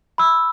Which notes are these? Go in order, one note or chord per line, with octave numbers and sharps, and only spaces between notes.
B5 E6